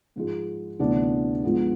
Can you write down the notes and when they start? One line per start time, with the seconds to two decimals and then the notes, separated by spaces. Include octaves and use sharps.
0.16 G#2 F3 G#3
0.79 D2 C3 E3 B3 D4
1.43 G#2 F3 G#3 B3 F4